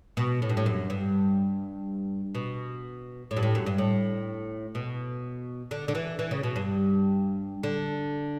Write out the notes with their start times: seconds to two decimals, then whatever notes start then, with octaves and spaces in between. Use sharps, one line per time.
0.17 B2
0.42 A2
0.49 G2
0.57 A2
0.66 F#2
0.90 G2
2.35 B2
3.31 A2
3.37 G2
3.43 A2
3.55 F#2
3.66 G2
3.78 A2
4.75 B2
5.71 D3
5.88 D3
5.95 E3
6.19 E3
6.31 C#3
6.43 B2
6.56 G2
7.63 D3